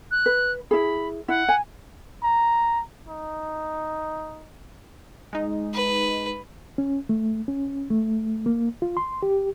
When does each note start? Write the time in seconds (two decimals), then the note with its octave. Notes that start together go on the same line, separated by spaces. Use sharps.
0.11 F#6
0.26 B4
0.71 E4 G#4 B5
1.28 E4 F#5
1.48 G#5
2.23 A#5
3.08 D#4
5.33 G#3 D#4
5.74 B4
6.78 C#4
7.09 A3
7.48 C#4
7.90 A3
8.46 A#3
8.82 F4
8.97 C6
9.23 G4